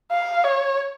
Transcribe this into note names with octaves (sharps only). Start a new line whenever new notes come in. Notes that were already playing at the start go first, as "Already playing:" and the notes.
F5
C#5